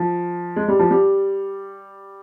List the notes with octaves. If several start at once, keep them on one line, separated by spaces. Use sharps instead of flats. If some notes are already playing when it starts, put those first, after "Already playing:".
Already playing: F3
G#3
G3
F3
G3